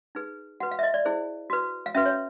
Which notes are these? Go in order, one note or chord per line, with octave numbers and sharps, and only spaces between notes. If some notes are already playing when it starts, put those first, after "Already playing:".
D#4 G#4 B4
F#4 B4 F#5
F5
E5
D#5
D5
E4 G#4 C5
F#4 B4
F5
C#4 F#4 B4 E5
C#5